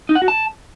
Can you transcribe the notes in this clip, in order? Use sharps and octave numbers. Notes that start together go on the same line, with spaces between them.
D#4
F#5
F#4
A5